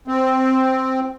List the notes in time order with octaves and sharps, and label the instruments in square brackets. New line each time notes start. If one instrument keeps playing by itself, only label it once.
[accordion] C4